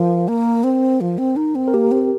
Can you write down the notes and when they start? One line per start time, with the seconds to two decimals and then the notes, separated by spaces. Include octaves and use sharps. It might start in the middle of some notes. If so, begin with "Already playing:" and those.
Already playing: F3 A#4
0.28 A#3
0.64 C4
1.01 F3
1.18 C4
1.36 D#4
1.55 C4
1.68 A#4
1.74 A#3 G4
1.92 C4